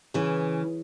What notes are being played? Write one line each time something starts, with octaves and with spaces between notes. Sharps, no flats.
C#3 E3